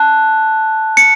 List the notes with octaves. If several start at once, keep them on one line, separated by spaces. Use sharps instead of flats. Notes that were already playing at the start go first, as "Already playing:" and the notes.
Already playing: A5 F#6
C#7